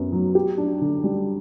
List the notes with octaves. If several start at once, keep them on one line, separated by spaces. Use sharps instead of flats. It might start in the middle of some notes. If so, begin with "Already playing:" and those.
Already playing: F#2 B3
F#3
G4
D4
D3
G3